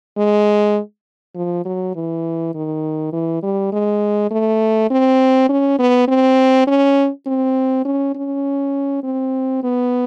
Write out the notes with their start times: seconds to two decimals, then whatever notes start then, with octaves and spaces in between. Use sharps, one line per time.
0.18 G#3
1.35 F3
1.65 F#3
1.95 E3
2.55 D#3
3.13 E3
3.43 G3
3.72 G#3
4.31 A3
4.91 C4
5.49 C#4
5.79 B3
6.08 C4
6.67 C#4
7.27 C4
7.85 C#4
8.15 C#4
9.04 C4
9.63 B3